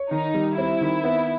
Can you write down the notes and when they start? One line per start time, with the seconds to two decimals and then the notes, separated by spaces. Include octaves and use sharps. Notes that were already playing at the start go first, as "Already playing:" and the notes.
Already playing: C#5
0.11 D#3 D#4
0.34 G3
0.58 C4 E4
0.81 D#3
1.04 B3